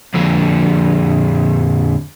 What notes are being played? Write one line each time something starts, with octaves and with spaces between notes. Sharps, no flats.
F2 D3